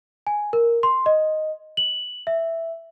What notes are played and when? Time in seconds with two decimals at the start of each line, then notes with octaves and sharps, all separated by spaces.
0.27 G#5
0.53 A#4
0.83 C6
1.06 D#5
1.77 F#7
2.27 E5